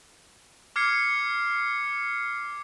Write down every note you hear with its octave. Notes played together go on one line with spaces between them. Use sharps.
D6 F6 G#6 C7 C#7